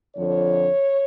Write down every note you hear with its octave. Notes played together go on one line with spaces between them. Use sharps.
F2 D3 F3 C#5